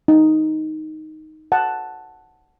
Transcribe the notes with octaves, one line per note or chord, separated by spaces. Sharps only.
D#4
F#5 A5